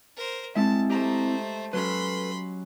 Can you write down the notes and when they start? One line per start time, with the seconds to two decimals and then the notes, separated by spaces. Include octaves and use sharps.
0.17 A#4 C5
0.56 G#3 C4 E4 E5 A5
0.89 A3 G4 C5 D#5 A#5
1.73 F#3 C#4 A4 B4 B5 C6